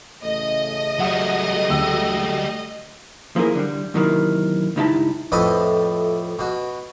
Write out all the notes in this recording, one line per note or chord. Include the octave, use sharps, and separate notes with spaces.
A1 C#3 A3 D#5
F#3 G3 E5 F#5 D#6
D2 G5 E6
F3 A#3 E4 G#4 A#4
D3 G3
F#2 C3 D#3 E3 A3 A#3
C#2 G2 D#4 E4 G4 A5
F2 A2 E4 B4 D#5
B2 F#4